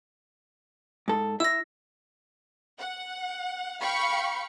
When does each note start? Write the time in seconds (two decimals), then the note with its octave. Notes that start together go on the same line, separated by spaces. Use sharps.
1.08 G#2 A4
1.40 E4 E5 E6 A#6
2.78 F#5
3.81 F5 G5 B5 C#6 C#7